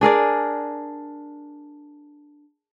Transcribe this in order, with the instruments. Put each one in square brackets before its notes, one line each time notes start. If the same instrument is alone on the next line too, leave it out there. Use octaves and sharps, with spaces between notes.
[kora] D4 G#4 A#4 D5